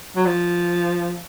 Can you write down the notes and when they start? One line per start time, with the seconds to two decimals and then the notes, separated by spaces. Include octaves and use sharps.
0.16 F#3
0.26 F3